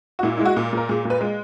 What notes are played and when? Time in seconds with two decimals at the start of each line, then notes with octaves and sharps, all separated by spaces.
0.19 F#4
0.23 A#2 E4
0.37 E4
0.40 G#3
0.45 F#4
0.56 A#2
0.73 A#2 A#4
0.89 A#2 G#4
1.05 A#2
1.10 B4
1.21 G#3